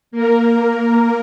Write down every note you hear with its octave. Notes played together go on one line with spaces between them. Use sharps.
A#3 A#4